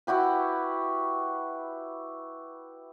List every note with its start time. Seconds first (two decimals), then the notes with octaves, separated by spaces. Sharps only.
0.07 E4 F#4 G4 B4